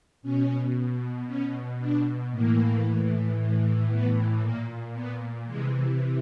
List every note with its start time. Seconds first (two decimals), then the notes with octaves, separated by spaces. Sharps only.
0.22 B2 C#4
1.27 B2 C#4
1.79 D4
2.31 A2 E3 A#3
3.36 A2 E3
3.89 B3
4.41 A#2 A#3
4.94 B3
5.46 C3 E3 G#3